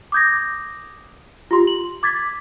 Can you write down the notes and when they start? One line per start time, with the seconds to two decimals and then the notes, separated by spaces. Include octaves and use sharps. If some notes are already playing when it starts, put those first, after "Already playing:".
0.12 D6 D#6 G6 G#6 A#6
1.51 F4 G4 C6
1.67 F#7
2.03 D6 G#6 A6 B6